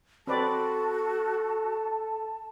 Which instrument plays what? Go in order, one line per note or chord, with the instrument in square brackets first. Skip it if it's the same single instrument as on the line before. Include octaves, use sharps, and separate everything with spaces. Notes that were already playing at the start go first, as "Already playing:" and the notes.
[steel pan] C4 B4 D5 [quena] F#4 [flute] A4 [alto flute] A5